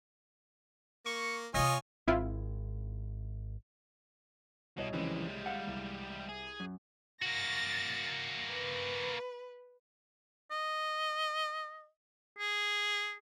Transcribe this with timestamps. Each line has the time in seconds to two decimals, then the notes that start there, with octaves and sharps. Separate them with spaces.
1.06 A#3 C#6
1.54 C3 A#3 F4 C#5 D#5 G#5
2.07 G#1 C4 E4 F4
4.77 C2 B2 C#5 D#5
4.93 F2 C#3 E3 G3 G#3
5.46 F5 F#5
5.67 C2
6.28 G#4
6.60 F#2
7.22 A#3 F#4 A6 A#6
8.53 B4
10.51 D#5
12.38 G#4